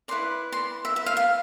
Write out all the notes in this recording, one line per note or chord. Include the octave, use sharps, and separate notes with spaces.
E4 B4 D5 C6
C6
E5
E5
F5
F5